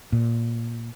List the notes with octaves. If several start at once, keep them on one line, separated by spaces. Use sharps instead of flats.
A#2